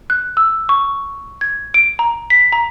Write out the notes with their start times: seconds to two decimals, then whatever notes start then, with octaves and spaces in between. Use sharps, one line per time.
0.10 F#6
0.37 E6
0.69 C#6
1.41 G#6
1.74 D7
1.99 A#5
2.30 B6
2.52 A#5